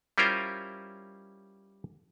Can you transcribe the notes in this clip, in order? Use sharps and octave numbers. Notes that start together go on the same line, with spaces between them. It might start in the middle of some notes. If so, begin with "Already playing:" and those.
G3 C#4 E4 F4 A#4 C5